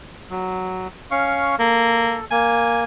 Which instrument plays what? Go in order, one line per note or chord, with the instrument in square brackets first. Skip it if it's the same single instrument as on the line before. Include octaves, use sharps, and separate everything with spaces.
[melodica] F#3
C#4 F5 C#6
[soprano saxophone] A#3 [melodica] A4
[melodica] A#3 [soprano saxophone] G#5